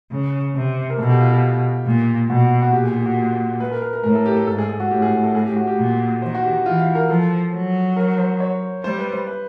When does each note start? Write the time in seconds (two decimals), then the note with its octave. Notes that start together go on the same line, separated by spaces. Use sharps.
0.12 C#3
0.55 C3
0.90 A#4
0.98 B2 A4
1.09 G4
1.20 F4
1.32 G4
1.86 A#2
2.29 B2 F#4
2.62 F#4
2.72 A#2 G4
2.84 G#4
2.94 G4
3.06 F#4
3.60 B4
3.71 A#4
3.82 A#4
3.93 A#4
4.04 A2 A#4
4.15 A4
4.26 G4
4.37 A4
4.47 G#2 A4
4.58 G#4
4.69 G#4
4.80 F#4
4.91 A2 G4
5.02 G#4
5.13 G#4
5.23 A4
5.35 G#4
5.45 G4
5.56 F#4
5.67 G4
5.78 A#2
6.22 D#3 C5
6.35 F#4
6.44 G4
6.65 E3 F4
6.80 F4
6.95 A#4
7.09 F3 A4
7.52 F#3
7.97 A#4
8.18 C5
8.40 C#5
8.83 G3 C5
8.98 B4
9.13 C5
9.27 B4